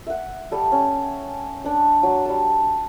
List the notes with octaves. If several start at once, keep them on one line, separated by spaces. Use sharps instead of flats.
E5 F#5
G3 A4
C#4
D4 D5
F#3
G3 A5